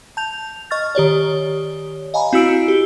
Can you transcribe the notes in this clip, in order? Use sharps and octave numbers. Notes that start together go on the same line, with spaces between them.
A5 G6 F7
D#5 C#6 F6 A6
D#3 G4 C#5 D5
D#5 F5 G#5 A#5 B5
C4 E4 F#4 E6 C#7 D7
G4